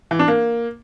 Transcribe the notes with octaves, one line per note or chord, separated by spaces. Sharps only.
E3
D4
A#3